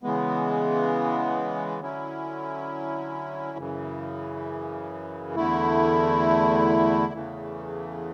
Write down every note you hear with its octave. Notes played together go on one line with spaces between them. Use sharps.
C#3 E3 G#3 B3
D3 F#3 C#4 E4
F#2 C#3 E3
E2 D3 A3 E4
E2 C#3 E3 A3